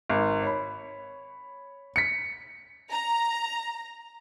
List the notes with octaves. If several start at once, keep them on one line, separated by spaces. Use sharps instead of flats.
G#1
C#5 B5
B6 C#7
A#5